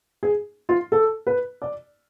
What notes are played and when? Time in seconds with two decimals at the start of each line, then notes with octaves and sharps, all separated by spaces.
0.23 G#4
0.69 F4
0.92 A4
1.27 B4
1.62 D5